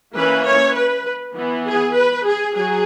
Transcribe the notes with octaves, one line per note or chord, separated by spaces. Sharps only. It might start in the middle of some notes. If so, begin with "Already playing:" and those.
E3 A#3 C#4 B4
C#5
B4
E3 B3
G#4
B4
G#4
F#3 G#4